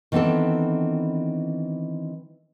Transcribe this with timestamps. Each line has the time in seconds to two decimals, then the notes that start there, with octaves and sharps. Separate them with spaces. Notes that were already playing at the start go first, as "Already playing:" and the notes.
0.12 D#3 E3 B3 C4 D4 A4